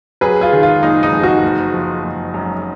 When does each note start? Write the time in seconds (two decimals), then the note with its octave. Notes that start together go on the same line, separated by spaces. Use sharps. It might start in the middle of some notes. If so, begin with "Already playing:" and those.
0.21 F#3 G#4 B4
0.41 F4 G#4
0.53 D#3
0.63 F4
0.83 F#1 D#4
1.03 D#4
1.12 F2
1.23 D#4 F#4
1.43 F#1
1.74 F3
2.03 F#1
2.34 F#2